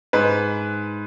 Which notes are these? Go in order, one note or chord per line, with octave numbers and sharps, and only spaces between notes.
G#2 B4